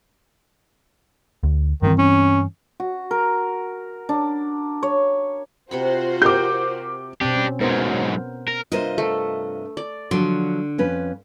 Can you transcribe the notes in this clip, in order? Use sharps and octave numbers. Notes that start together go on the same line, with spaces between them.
D2
G2 D#3 E3 C4
C#4
F#4
A#4
D4
C#5
C3 F4 F#4 C5 F#5 B5
G4 A#4 D6 G6
B2 C4 D4 G4
C#4
G#2 F#3 B3 A#4 C5
A#4
G2 C3 F4 A#4 C5 D#5
A3
D5
D3 F3 F#3 C6
F2 C#4 B4